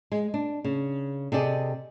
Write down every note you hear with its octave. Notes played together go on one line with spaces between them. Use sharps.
G#3
D4
C#3
C3 G#4 A4 D5 D#5